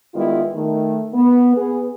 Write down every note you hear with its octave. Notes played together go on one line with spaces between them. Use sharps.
D#3 G3 G#3 B3 E4 F4
D#3 A3
B3
B3 G#4